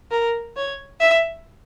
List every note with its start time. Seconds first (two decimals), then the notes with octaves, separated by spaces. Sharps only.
0.11 A#4
0.57 C#5
1.00 E5